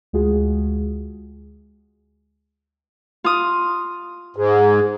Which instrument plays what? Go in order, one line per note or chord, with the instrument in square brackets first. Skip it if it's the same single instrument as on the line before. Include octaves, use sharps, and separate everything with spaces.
[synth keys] D2 G#3 F4 F#4 G#4
[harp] F4 D#6
[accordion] G#2 [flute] G#4